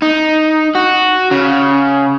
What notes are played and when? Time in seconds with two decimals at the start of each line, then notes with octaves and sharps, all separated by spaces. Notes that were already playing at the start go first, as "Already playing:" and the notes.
0.02 D#4
0.75 F#4
1.31 C#3